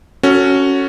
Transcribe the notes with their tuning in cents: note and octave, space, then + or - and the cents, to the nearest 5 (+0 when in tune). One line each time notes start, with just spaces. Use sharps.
C#4 +0 F#4 +0 A4 +25